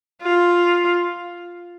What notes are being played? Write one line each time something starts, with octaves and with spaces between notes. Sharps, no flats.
F4